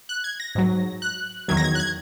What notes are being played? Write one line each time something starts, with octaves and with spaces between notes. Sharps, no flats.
F#6
G#6
A#6
G#2 F#3
F#6
E2 D#3 F#3 G#6
A#6
G#6
F#6
G#6